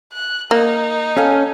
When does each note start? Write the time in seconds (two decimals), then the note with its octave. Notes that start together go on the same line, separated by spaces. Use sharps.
0.13 F#6
0.51 A#3 D#4
1.16 C#4 A4 F5 G#5